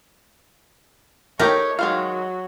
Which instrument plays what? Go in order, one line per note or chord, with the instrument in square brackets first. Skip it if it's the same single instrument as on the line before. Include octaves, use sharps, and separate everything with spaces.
[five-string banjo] A3 D#4 G4 [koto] A#4 [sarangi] C#5
[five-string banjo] D#3 G#3 F5 [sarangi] F#3